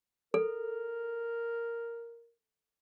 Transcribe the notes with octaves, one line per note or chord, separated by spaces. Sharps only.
A4 A#4